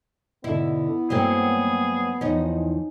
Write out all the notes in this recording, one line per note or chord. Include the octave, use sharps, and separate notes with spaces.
G#2 B2 D3 B3 E4
G2 F#3 A3 A#3 C4 G#4
E2 D#3 F3 C#4 D#4